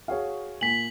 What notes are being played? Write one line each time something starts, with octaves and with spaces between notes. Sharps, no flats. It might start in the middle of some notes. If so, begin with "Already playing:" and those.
F#4 G#4 C#5 F5
A#2 G#5 B6 F#7